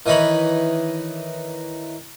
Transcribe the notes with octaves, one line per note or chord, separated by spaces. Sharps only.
D#3 E3 D#4 C#5 B5